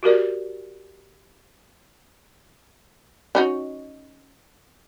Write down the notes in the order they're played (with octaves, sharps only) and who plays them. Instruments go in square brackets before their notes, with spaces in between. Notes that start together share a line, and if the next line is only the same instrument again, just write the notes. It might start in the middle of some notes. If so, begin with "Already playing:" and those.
[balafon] F#4 G4 A#4 D5
[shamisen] C#4 D#4 F#4